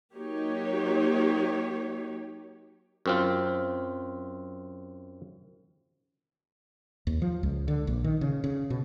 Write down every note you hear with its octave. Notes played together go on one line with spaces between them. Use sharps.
F#3 A#3 D#4 G4 C#5
F#2 C4 F4
D#2
F3
C#2
D3
A#1
D#3
C#3
C#3
B2